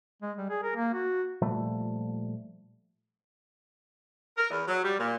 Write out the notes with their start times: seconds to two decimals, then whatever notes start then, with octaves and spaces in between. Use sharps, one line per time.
0.22 G#3
0.37 G3
0.49 G#4
0.63 A#4
0.76 A#3
0.94 F#4
1.42 A#2 F3 G3 A3
4.38 A#4
4.50 E2
4.68 F#3
4.83 G3
4.98 A#2